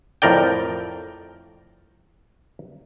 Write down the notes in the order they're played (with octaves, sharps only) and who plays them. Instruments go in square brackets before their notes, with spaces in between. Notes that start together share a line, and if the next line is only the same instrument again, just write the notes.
[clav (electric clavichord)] F2 A2 A#4 D5 G5